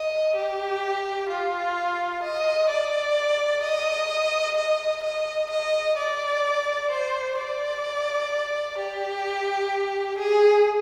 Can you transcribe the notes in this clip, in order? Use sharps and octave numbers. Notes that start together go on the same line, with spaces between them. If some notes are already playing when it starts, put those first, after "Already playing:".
Already playing: D#5
G4
F4
D#5
D5
D#5
D#5
D#5
D#5
D5
C5
D5
G4
G#4